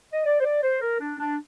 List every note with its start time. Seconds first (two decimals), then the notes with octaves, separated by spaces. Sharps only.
0.12 D#5
0.25 D5
0.40 C5
0.44 D5
0.63 C5
0.81 A#4
1.00 D4
1.19 D4